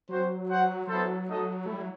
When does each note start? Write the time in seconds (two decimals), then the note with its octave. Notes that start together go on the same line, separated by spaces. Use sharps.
0.09 F#3 C4 F#4 C5
0.48 F#4 C5 F#5
0.87 F#3 B3 E4 A4 C5
1.26 A3 D#4 A4 D#5
1.65 A3 E4
1.73 G3
1.81 F#3